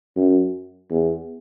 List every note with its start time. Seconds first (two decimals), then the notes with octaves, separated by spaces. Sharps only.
0.16 F#2
0.91 E2